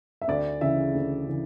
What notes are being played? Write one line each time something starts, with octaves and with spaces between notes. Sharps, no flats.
E5
D2 D5
C#3 E3 E5
D2
C#3 E3